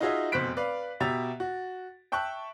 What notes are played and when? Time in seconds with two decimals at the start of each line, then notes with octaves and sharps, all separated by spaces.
0.01 D#4 F4 F#4 G#4 D#5 E5
0.32 F1 B2 C5 F#6 B6 D7
0.57 B4 D5 F5
1.00 B2 G4 E5 A#5 A6 F7
1.40 F#4
2.12 E5 G5 A5 C#6 F#6